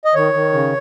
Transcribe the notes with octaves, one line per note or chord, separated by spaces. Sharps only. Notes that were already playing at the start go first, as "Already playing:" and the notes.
D#5
D#3 C#5
D#3
C#3